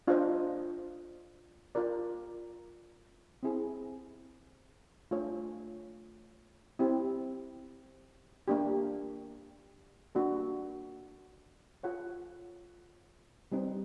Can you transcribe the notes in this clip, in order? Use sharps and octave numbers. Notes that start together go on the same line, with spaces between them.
D4 F4 A4 C5 D#5
F4 A#4 D5
C4 E4 G#4
A3 D4 F4 A4 C#5
C4 E4 G4
A#3 D4 G4
A#3 D4 F#4 A4
F4 A4 C#5 F#5
G3 C4 D#4